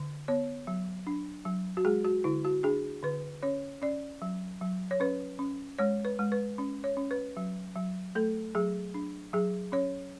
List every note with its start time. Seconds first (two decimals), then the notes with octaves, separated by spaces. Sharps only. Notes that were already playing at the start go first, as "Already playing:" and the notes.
Already playing: D3
0.28 B3 C#5
0.67 F#3
1.07 D4
1.46 F#3
1.77 F#4
1.85 G#3 G#4
2.05 F#4
2.24 D3 E4
2.45 F#4
2.63 D4 G#4
3.03 D3 B4
3.42 C#4 C#5
3.82 C#4 D5
4.22 F#3
4.61 F#3
4.91 C#5
5.00 C#4 B4
5.39 C#4
5.78 G#3 C#5
6.05 B4
6.19 G#3
6.32 B4
6.58 C#4
6.84 C#5
6.97 C#4
7.11 B4
7.37 F#3
7.76 F#3
8.15 A3 A4
8.55 F#3 G#4
8.94 D4
9.33 F#3 G#4
9.72 C#4 C#5